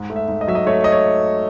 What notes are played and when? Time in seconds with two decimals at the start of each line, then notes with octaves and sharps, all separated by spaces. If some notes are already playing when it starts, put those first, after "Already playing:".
Already playing: G#2
0.10 A3
0.16 E5
0.28 G#2
0.41 D#5
0.48 F#3 E5
0.55 D#5
0.67 A3 C#5
0.84 D#5
0.92 C#5